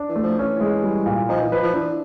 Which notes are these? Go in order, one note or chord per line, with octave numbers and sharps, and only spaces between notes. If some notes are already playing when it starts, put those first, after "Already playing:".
Already playing: D4
E3
A3
F3
E3 C#4
G#3
G3
A#2
F3 D#4
E3
F3 B4
F3
E3 D4